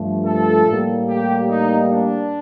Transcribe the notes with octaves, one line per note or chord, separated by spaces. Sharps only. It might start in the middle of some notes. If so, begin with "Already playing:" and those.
Already playing: G2 F3 A3
A4
A2 G3 A#3
G4
D#4
D4